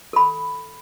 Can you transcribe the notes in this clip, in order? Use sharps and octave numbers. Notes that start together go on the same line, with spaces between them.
A4 B5